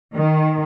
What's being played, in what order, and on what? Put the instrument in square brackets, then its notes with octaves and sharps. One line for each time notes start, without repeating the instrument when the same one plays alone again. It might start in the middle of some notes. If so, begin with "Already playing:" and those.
[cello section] D#3